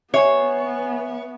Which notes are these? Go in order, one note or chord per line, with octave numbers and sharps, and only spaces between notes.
B3 C#5 E5 G#5